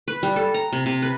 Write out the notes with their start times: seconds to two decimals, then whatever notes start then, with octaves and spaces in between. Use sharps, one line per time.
0.08 B4
0.23 G3
0.36 A4
0.54 A#5
0.72 C3
0.86 C3
1.02 B4